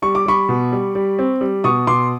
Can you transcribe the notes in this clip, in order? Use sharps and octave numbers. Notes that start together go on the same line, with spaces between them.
G3 C#6
D6
G3 B5 C#6
B2
G3
G3
C4
G3
B2 C#6 D#6
B2 C6 D6